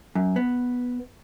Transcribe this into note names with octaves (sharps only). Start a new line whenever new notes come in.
F#2
B3